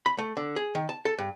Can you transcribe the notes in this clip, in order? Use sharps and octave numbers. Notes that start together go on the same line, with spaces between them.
B5
A3
D3
G#4
D#3
A5
A4
G2